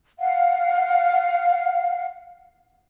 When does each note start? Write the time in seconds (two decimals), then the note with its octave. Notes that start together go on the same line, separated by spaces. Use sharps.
0.20 F5 F#5